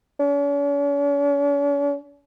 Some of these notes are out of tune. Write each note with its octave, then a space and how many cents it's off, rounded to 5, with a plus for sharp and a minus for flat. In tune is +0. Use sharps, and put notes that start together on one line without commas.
C#4 +45